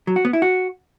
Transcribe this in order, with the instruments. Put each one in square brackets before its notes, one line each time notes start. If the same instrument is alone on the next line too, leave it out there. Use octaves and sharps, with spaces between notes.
[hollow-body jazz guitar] F#3
F#4
B3
E4
F#4